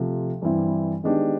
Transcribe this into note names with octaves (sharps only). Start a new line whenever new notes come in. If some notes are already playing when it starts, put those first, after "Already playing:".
Already playing: C3 F3 A3
G2 E3 G3 C4 E4
D#3 G#3 B3 D4 G4